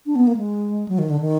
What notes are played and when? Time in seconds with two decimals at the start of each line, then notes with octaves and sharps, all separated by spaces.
0.06 D4
0.15 B3
0.27 A#3
0.37 G#3
0.88 F#3
0.98 D#3
1.10 D3
1.20 D#3